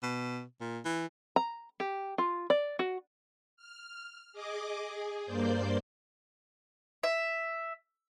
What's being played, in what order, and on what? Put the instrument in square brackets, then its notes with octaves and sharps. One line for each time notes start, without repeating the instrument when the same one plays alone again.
[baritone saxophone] B2
A#2
E3
[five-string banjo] A#5
G4
F4
D5
F#4
[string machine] F6
G#4 D#5 D6
G#4
G2 A#3 C5 D5 G6
[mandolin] E5